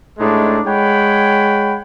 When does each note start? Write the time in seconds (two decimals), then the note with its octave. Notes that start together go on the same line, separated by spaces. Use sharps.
0.19 A2 G#3 A3 D4 D#4
0.67 G#3 C#5 F#5 G5 B5